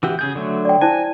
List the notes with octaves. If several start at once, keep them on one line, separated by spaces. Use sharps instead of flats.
E3 F#4 G4 E6
C#3 G#4 G6
D3 F#3 A3
D5 G5
E4 C5 G#5 A5